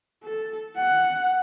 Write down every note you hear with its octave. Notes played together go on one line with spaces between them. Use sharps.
A4
F#5